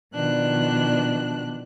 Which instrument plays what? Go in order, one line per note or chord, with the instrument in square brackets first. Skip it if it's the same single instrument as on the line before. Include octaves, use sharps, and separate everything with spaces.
[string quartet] B2 D#3 F3 D4 F#6